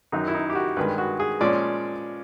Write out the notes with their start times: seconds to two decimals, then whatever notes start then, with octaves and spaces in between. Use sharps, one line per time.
0.12 F#2 D#3 F#3 D#4
0.28 E4
0.35 D#4
0.50 G4
0.55 F#4
0.77 G2 D#3 G#3 B4
0.98 F#4
1.20 G#4
1.40 A#2 F3 G#3 C#4 D5